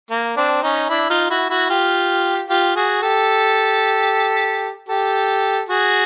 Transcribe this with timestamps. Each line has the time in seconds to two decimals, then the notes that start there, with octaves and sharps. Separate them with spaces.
0.10 A#3
0.37 C4 D4
0.63 C#4 D#4
0.90 D4 E4
1.10 D#4 F4
1.30 E4 F#4
1.50 E4 F#4
1.69 F4 G4
2.49 F4 G4
2.76 F#4 G#4
3.02 G4 A4
4.89 G4 A4
5.69 F#4 G#4